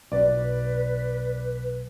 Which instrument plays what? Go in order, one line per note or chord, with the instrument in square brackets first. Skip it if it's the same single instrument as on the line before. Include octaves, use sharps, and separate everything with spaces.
[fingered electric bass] B1 [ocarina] B4 [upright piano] D5